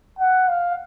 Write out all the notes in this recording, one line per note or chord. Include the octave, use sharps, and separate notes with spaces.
F#5
F5